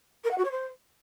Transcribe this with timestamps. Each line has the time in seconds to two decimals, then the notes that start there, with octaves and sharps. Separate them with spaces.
0.24 A#4
0.31 F#5
0.38 F#4
0.44 C#5
0.51 C5